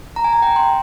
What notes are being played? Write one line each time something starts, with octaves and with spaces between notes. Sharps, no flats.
A#5
G#5
A#5
G5
C6